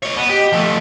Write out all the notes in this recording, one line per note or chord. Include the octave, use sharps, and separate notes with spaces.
C#5 D#5
B3
G4 D#5
F3 A3